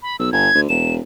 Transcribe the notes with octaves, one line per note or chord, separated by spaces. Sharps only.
B5
B1 E6
G1 G#6
D2
E1 E7